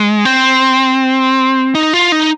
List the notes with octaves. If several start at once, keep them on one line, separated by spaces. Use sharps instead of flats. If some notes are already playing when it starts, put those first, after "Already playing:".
Already playing: G#3
C4
D#4
F4
D#4